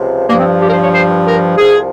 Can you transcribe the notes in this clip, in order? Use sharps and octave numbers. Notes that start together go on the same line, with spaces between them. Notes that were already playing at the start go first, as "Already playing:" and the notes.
Already playing: C#2 C3 F3
G2 F3 A#3
C4
G4
A#4
C5
C#5
C5
A#4
C2 C3 F3 G#4